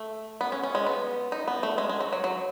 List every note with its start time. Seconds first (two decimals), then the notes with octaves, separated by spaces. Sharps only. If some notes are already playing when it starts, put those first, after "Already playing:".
Already playing: A3
0.41 B3
0.52 C#4
0.63 C#4
0.75 G#3
0.86 B3
1.32 D#4
1.48 B3
1.63 A3
1.78 G#3
1.89 G#3
2.01 F#3
2.13 F#3
2.24 F#3